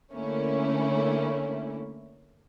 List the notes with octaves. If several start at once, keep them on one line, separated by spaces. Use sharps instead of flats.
D3 A3 A#3 C#4 E4